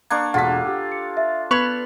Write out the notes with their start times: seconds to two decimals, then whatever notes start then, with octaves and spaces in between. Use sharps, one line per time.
0.10 A#3 D4 C#6 G#6
0.34 E1 F4 A4 F#5 B6
0.66 G4
0.92 C#7
1.17 E5
1.51 B3 B4 C#6 G#6 F7